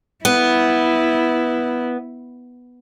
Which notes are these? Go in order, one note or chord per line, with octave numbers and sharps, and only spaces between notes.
B3 E4